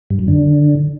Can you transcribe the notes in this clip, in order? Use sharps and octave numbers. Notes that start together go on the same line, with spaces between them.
G2
F#2
D3